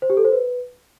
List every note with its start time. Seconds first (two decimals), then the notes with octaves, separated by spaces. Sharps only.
0.02 C5
0.10 G4
0.17 A4
0.25 C5
0.32 B4